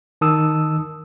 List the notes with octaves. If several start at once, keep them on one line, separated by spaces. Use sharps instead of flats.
D#3 A5 D#6 E6